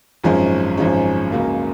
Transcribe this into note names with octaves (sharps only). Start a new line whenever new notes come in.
G#1 F#2 F3 G#3 C#4
G#1 F#2 F3 G#3 C#4
C#2 C#3 F#3 A#3 C#4